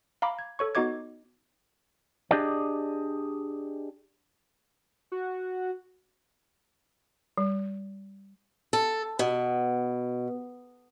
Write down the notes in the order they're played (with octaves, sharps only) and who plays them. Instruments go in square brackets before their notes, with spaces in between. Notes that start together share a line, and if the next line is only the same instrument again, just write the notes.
[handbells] F5 A#5 B5 D6
G#6
A4 C#5 C#6
B3 D#4 F#4 D#5 D6 G#6
[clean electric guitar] D4 G4 G#4 D5 D#5
[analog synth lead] F#4
[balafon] G3
[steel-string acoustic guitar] A4
B2